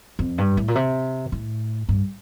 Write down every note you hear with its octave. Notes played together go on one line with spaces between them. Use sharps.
F2
G2
A2
A#2
C3
A2
G2